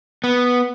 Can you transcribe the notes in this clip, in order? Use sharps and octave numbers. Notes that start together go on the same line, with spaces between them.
B3